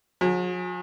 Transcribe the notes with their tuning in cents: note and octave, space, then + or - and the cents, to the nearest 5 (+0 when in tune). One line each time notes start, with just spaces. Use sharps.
F#3 -45 G#4 +0